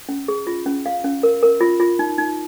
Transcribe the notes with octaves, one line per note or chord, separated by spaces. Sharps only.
C#4
G#4
F4
C#4
F5
C#4
A#4
A#4
F4
F4
D#4
D#4